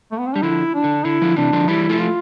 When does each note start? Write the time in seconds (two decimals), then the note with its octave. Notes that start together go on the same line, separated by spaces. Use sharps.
0.12 A3
0.19 B3
0.27 C4
0.34 G3 D4
0.43 D3 F3 E4
0.74 D4
0.84 D3
1.05 D3 E4
1.22 D3 F3
1.36 C3 E3 D4
1.53 D3 F3
1.68 E3 G3 E4
1.90 F3 A3
2.00 F4